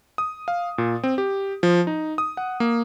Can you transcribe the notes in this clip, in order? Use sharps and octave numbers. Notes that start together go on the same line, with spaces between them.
D#6
F5
A#2
C4
G4
F3
D#4
D#6
F#5
A#3